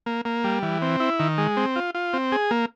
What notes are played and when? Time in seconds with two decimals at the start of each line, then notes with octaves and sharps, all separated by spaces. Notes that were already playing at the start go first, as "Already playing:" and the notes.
0.06 A#3
0.25 A#3
0.44 G3
0.63 E3
0.82 C4
1.00 E4
1.19 D#3
1.38 G#3
1.57 C4
1.76 F4
1.95 F4
2.13 C4
2.32 G#4
2.51 A#3